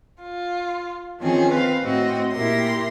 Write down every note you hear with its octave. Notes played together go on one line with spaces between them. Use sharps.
F4
D#3 F3 C4 C#4 G#4
C4 B4 C5 F5
A2 C4 F#4 D#5
A#2 E4 G4 A#4 C6 A#6